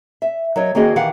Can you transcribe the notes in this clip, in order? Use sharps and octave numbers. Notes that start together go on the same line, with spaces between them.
E5
F#3 A#4 C#5 D#5
D#3 A#3 C4 F#4 G#4 D#5
D#3 E3 G4 F5 F#5